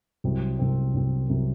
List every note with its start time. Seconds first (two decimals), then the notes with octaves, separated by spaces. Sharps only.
0.24 C2 C3 F#3 C4
0.59 C2 C3 F#3 C4
0.94 C2 C3 F#3 C4
1.29 C2 C3 F#3 C4